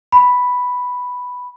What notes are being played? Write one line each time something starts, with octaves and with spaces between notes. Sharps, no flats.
B5